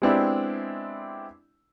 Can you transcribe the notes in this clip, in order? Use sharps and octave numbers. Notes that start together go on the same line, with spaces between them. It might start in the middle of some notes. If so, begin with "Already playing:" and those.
G#3 B3 C4 D4 E4 G4